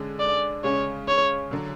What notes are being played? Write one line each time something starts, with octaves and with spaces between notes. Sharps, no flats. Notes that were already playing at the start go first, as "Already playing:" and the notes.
Already playing: D3 G#3 C#4 G#4
D5
C#3 G#3 C#4 C#5
C#5
D3 F#3